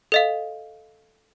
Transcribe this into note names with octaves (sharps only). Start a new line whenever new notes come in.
A4 D#5 F5